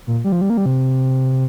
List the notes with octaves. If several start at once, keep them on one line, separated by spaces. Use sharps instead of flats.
A#2
G3
F3
G3
A#3
G3
C3